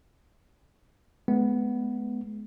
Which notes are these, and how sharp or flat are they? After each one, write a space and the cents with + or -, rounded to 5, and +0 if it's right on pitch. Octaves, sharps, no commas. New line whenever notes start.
G#3 +40 B3 +5